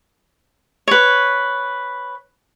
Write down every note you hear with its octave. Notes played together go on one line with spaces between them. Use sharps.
B4 C#5